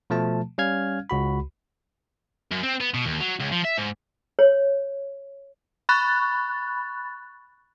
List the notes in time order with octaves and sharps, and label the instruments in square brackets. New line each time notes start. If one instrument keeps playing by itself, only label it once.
[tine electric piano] B2 F3 A3 A5
G3 C#4 F5 F6 G#6
C#2 F#4 B5
[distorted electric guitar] F#2
C4
B3
B2
D#2
F#3
C#2
F3
E5
G#2
[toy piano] C#5
[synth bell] B5 C#6 F#6 A6